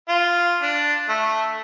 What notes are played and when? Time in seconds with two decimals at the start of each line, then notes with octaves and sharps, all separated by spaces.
0.09 F4
0.62 D4
1.09 A3